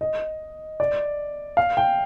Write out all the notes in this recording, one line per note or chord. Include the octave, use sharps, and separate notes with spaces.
D#5
D5
F5
G5